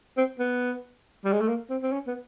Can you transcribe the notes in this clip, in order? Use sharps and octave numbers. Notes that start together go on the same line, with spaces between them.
C4
B3
G3
G#3
A3
A#3
C4
C4
C#4
B3